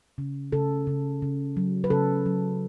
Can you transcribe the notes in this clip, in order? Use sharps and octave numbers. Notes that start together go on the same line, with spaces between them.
C#3
C#3 A4
C#3
C#3
F#3
B4
C#3 A4
F#3